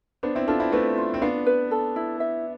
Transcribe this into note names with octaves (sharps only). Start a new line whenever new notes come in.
B3 D4 C5
C4 E4
D4 F4 A4
C4 E4
A3 C4 B4
F4
C4
B3 D4 F5
B4
A4
E4
E5